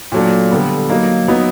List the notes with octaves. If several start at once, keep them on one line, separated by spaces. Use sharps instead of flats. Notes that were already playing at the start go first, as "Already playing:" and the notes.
A#2 F#3 A3 D4
D3 G3 B3
F#3 A#3 D#4
F#3 B3 D#4